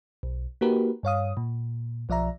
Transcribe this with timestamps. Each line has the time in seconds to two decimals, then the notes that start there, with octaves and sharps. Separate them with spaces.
0.23 B1
0.61 A#3 D#4 F#4 G4 A#4 B4
1.03 G2 C#5 F5 D#6
1.37 A#2
2.09 B1 F3 D5 E5 A#5